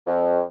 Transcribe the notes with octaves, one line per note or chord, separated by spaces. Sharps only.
F2